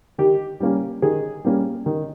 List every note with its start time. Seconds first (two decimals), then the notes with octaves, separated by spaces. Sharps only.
0.18 D#3 G4
0.60 G3 A#3 C#4
1.02 D#3 G#4
1.45 G3 A#3 C#4
1.86 D#3